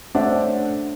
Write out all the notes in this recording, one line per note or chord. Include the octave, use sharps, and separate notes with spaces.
A3 C#4 D4 C5 E5 F#5